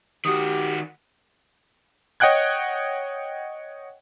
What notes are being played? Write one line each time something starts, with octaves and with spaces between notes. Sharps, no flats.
D#3 F#4 G4 D#6
C#5 D#5 F#5 G5 F#6 G#6